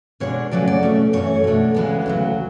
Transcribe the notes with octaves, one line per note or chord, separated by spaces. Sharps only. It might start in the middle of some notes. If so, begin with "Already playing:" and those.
B2 G#3 D4 C#5
C#3 F#3 A3 C#4 D5
D5
B2 A3 C#4
F#2 E3 A3 C#4 C#5
B2 A3 D4
D2 C#3 E3 G#3 B3
D2 C#3 F#3